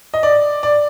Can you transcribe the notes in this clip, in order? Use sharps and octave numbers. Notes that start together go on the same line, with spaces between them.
D#5
D5
D5